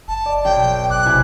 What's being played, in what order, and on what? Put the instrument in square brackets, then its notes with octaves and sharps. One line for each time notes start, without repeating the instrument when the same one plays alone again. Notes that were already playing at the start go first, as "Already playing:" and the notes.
[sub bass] F#1 [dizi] A5
[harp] D5
[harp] B1 [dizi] G5
[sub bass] A1 [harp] D6 [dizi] F#6
[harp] C3 E4 G#5